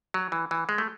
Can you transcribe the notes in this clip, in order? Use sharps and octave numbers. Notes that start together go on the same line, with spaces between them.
F#3
E3
E3
G#3
A3